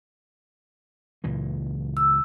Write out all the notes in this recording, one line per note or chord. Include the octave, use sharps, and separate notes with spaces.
C#2 A#2 E3
E6